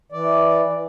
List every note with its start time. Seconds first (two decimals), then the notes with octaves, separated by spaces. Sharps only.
0.12 E3 D5